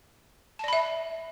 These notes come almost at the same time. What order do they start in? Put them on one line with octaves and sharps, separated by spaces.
A5 D5 B5 E5